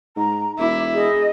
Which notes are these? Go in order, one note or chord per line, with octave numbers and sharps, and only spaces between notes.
G#2 A#5
E1 E4 D6
G#4 D#5